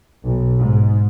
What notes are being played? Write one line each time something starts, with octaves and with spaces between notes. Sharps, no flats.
B1
G#2